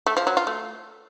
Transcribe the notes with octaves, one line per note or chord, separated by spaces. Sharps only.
A3
F3
F#3
F4
A3